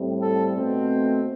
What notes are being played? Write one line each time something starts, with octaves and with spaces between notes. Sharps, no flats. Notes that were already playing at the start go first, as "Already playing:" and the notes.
Already playing: A2 G3 C4
A4
B2 A3 C4